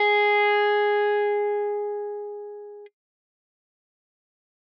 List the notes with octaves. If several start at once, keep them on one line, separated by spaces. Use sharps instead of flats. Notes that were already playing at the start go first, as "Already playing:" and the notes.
Already playing: G#4